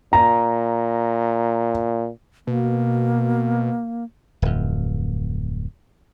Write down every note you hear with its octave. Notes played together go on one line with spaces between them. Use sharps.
A#2 A#5
B2 A#3
D1 F2